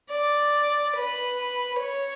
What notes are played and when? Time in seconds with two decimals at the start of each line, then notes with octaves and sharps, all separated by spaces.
0.11 D5
0.96 B4
1.81 C#5